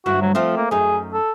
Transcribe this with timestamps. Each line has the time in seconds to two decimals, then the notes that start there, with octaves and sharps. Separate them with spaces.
0.06 D2 G2 E4 F#4
0.22 F#3
0.35 F3 A3 C4 F4
0.56 A#3
0.71 F#2 D#4 G#4
1.13 A4